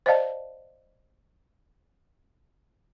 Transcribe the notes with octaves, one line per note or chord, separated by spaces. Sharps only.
C5 D5 D#5 F5 A5